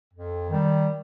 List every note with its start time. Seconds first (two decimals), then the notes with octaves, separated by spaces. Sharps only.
0.14 F2
0.50 D#3 G3